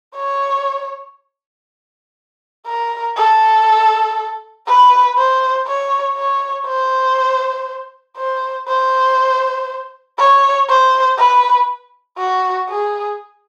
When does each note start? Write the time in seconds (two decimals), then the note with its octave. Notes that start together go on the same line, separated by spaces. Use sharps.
0.15 C#5
2.66 A#4
3.17 A4
4.66 B4
5.18 C5
5.67 C#5
6.16 C#5
6.67 C5
8.17 C5
8.68 C5
10.18 C#5
10.68 C5
11.18 B4
12.18 F#4
12.69 G#4